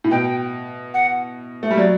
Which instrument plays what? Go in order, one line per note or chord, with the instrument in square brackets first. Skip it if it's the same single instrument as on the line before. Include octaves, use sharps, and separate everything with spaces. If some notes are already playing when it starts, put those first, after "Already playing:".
[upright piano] A2
[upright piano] B2 [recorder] G5
[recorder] F#5
[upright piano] A3
G3
[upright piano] F#3 [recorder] D5